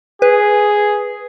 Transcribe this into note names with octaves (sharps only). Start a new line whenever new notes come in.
G#4 B4